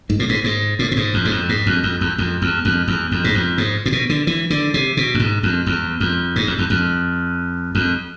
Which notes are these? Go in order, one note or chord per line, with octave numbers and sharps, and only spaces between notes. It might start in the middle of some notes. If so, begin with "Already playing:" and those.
G#2
A2
G#2
G#2
A2
A2
G#2
F2
G#2
F2
G#2
F2
F2
E2
F2
E2
F2
E2
F2
G#2
F2
G#2
A2
B2
D3
E3
D3
C3
B2
F2
G#2
F2
E2
F2
G#2
F2
E2
F2
F2